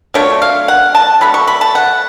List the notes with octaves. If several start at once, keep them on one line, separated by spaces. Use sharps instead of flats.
F#3 A3 D4 F4 C#5
F5
F#5
A5
F#3 A3 D4 B5
C#6
B5
A5
F#5